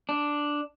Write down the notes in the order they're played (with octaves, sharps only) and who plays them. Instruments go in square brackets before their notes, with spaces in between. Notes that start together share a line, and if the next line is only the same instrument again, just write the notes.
[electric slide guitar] D4